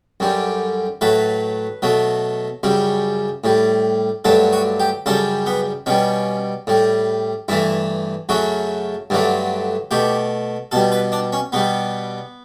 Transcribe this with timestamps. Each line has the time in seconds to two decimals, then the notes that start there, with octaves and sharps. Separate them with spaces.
0.20 F#2 D3 G3
1.01 A2 F#3 A3 B4
1.82 B2 F#3 A3
2.63 F#2 C#3 G3
3.44 A2 G3
4.25 G2 D3 F#3 A3 A4
4.53 F#4
4.80 G4
5.06 F#2 C#3 G3 A4
5.46 B3
5.86 B2 G3 C#4
6.67 A2 G3
7.48 G2 E3 A3 E4
8.29 F#2 C#3 F#3 A3 F#4
9.10 G2 D3 F#3 A3
9.91 B2 A3 G4
10.72 B2 G3 A4
10.92 B4
11.12 D4
11.33 C#4
11.52 B2 G3 B3